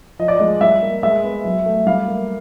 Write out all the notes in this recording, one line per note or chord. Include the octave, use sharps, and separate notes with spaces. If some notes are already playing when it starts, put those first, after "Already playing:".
F3 D#5
D5
G#3 D#5
G3 E5
A#3
G#3 E5
B3
F#3
A3
G3 F5
A#3